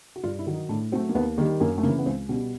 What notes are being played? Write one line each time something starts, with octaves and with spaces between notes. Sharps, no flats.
F#4
G2 F4
E4
D#3 F#3
D#4
A2 D4
F#3 A3 C4
A#3
D#2 B3
D#3 G3 A#3
F#2 A#3
A3
C#3 E3 A#3
B3
C#2 C4
B2 G3 C#4